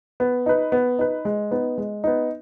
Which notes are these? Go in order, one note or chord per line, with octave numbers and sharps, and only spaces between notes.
B3
D#4 B4
B3
D#4 B4
G#3
B3 D#4
G#3
B3 D#4